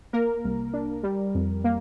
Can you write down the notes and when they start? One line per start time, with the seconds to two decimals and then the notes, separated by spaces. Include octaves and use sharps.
0.13 A#3 A#4
0.44 C2
0.73 D4
1.03 G3
1.35 F2
1.64 A#3